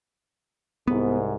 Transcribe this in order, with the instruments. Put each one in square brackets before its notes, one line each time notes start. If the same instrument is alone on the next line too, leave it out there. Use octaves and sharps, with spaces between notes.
[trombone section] C2 G#2 [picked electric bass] B3